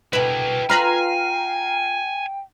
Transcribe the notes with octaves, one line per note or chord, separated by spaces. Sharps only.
B2 E4 A#4 B4 G5
F4 B4 G#5 A#5 F6 C7